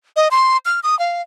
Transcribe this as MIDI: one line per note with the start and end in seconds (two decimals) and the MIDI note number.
0.16 0.28 75
0.31 0.57 84
0.65 0.80 89
0.83 0.98 87
0.99 1.22 77